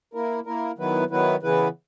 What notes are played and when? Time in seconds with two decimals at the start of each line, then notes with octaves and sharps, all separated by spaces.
0.14 A#3 E4 A#4
0.46 A#3 E4 A#4
0.78 D#3 F#3 B3 E4 B4
1.10 D#3 F#3 B3 E4 B4
1.43 C#3 E3 B3 E4 B4